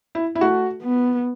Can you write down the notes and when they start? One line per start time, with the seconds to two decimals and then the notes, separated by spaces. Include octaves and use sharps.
0.15 E4
0.35 E4
0.41 A3 F#4
0.82 B3